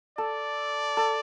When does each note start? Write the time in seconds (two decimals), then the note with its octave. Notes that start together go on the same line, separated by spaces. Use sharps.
0.18 A4 D5
0.97 A4